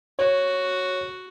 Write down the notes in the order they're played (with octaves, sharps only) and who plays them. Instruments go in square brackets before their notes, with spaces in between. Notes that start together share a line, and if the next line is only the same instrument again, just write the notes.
[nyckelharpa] F#4 [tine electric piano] C#5